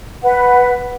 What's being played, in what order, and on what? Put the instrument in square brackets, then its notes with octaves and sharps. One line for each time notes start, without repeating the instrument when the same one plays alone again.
[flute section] B4 F#5